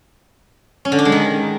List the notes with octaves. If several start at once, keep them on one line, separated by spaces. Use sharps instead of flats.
C#4
D3
D4
G#3
D#3